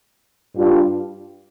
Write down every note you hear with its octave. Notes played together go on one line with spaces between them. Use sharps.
G2 G3 D4 F4